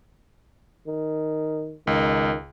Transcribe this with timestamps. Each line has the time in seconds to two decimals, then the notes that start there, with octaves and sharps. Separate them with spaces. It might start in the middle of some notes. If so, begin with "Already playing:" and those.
0.88 D#3
1.87 C#2 D#3